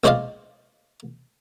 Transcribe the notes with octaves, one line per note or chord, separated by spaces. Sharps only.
A#1 G#3 C5 D5 D#5 F5